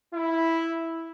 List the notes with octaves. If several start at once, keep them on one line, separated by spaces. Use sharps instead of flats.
E4